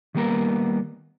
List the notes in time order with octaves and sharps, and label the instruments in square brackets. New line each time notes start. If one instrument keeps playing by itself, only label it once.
[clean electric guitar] D#3 G3 A#3 B3 A#4